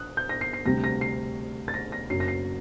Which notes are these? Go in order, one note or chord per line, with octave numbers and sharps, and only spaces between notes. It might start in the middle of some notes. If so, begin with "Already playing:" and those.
Already playing: D#6 F#6
G6
A#6
C7
C7
D2 C3 G3 A#6
A#6
C7
A6
A#6
A#6
F#1 F#2 F#3 C7
A#6
C7